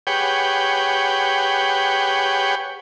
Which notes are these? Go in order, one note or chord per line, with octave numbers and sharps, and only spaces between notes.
G4 G#4 B4 C#5 F#5 G5